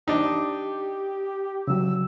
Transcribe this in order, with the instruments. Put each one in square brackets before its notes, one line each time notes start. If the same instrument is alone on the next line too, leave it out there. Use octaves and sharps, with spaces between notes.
[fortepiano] D4 D#4 [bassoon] G4
[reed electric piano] C#3 F#3 [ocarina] E6